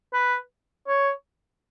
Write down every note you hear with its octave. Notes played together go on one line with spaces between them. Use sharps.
B4
C#5